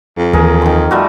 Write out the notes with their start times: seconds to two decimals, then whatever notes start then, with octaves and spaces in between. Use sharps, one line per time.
0.17 F2
0.33 D#2 E3 G#4 A#4
0.62 D#3 C6
0.91 G3 A3 F4 F#4